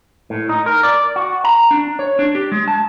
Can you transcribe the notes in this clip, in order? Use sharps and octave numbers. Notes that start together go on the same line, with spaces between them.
A2
D#4
A#4
D5
F#4
A#5
D4
C#5
D4
G4
G#3
A5